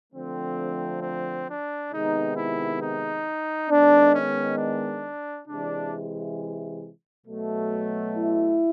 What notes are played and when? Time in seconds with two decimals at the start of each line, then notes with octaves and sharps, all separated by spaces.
0.13 D3 F3 A3 C4
1.02 C4
1.47 D4
1.91 C3 D#3 G#3 B3 D#4
2.36 E4
2.81 D#4
3.69 D#3 G#3 B3 D4
4.14 C#4
4.58 D4
5.47 C3 E3 G#3 D4
7.26 B2 F#3 A3
8.14 E4